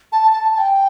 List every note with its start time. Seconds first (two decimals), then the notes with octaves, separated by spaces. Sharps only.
0.12 A5
0.33 A5
0.54 A5
0.58 G5